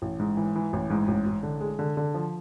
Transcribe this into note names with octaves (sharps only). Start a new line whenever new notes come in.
A1
G#2
E3
E3
A1
G#2
A1
A1
D3
G#3
D3
D3
F3